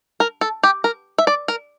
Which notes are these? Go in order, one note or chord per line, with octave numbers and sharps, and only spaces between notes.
A#4
A4
G4
A#4
E5
D5
A#4